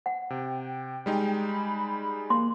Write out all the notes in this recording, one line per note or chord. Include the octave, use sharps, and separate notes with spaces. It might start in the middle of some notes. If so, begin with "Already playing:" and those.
F#5
C3 G5
G3 G#3 D#4
B5
A#3 C6